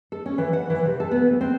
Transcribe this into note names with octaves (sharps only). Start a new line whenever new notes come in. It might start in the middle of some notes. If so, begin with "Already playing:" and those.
A4
C#4
E3
F#5
E3
C3
A4
B3
D2
C4